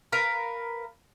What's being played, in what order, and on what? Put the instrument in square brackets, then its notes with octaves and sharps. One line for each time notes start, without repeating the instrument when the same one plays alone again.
[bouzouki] A#4 B4 F5 A#5